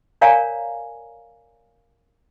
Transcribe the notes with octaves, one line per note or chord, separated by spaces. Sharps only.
A#4 C#5 D5 F5 G#5 A#5